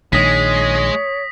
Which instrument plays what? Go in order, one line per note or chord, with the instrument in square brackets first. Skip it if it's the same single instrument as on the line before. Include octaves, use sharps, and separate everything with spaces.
[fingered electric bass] A#1 D#3 [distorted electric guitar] G#3 [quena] C#5 [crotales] D#6 A#6 B6